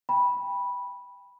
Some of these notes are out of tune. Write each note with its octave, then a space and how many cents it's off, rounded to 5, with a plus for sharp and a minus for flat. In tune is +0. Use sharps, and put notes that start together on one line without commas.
G5 +25 B5 -10